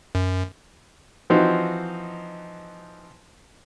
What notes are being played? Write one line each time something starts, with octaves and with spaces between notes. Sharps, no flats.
F#2
E3 F3 C4 D#4 F#4